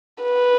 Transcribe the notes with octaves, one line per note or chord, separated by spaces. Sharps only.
B4